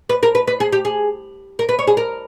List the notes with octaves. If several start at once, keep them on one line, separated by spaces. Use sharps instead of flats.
B4
A#4
B4
B4
G#4
G4
G#4
A#4
B4
C#5
G#4
A#4